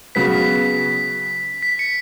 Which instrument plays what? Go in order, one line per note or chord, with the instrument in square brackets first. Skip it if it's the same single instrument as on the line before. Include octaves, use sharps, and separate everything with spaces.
[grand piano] C#3 F#3 B3 [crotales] B6
[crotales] B6
C#7